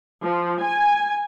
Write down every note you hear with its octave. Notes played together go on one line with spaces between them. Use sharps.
F3
G#5